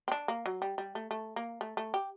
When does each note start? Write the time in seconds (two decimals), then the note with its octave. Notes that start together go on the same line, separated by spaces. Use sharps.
0.08 C4
0.12 D4
0.28 A#3
0.46 F#3
0.62 G3
0.78 G3
0.95 A3
1.11 A3
1.36 A#3
1.61 A3
1.77 A3
1.94 G4